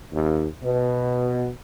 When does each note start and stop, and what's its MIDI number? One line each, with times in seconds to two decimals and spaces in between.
0.12 0.46 39
0.63 1.47 47